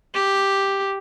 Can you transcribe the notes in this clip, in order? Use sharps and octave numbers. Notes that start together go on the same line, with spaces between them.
G4